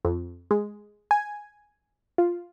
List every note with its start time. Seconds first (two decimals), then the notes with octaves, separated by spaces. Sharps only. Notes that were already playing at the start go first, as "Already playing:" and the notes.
0.05 F2
0.51 G#3
1.11 G#5
2.18 F4